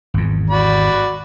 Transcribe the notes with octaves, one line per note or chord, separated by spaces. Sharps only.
G#1 E2
F#4 D5 B5